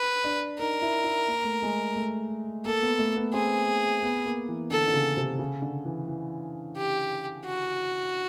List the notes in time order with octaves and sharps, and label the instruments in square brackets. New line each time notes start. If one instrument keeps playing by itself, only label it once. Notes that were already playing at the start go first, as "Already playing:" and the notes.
Already playing: [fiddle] B4
[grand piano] D4
[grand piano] D#4 [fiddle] A#4
[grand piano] E4
E4
A#3
A3
G#3
A3
[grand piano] A#3 [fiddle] A4
[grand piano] B3
A3
B3
[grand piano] C4 [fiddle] G#4
[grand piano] B3
A#3
E3
[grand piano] D3 [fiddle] A4
[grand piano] D3
C#3
C3
C#3
D3
E3
E3
[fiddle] G4
F#4